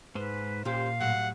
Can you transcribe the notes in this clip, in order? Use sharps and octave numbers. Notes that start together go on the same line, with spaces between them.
G#2 B4 C5
A#2 C#4 G4 C5 F5
A2 F#3 G3 F#5